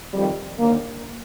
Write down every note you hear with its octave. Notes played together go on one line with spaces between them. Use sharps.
F2 D#3 G3
D#2 D3 A#3